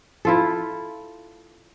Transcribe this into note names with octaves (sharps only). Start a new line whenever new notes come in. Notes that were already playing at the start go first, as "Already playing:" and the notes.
E4 F4 A4